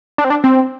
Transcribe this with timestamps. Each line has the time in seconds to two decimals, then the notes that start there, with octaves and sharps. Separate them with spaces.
0.18 D4
0.24 C4
0.30 D4
0.44 C4